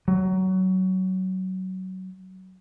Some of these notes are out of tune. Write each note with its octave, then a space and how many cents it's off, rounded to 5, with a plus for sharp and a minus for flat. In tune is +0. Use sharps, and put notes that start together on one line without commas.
F#3 +20